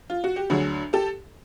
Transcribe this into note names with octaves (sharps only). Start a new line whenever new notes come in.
F4
F#4
G4
D2 D3 F#3 F#4 G#4
G4 A4